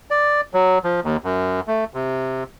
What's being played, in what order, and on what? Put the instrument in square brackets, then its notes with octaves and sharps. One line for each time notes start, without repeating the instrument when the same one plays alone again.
[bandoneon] D5
F#3
F3
D#2
F#2
A3
C3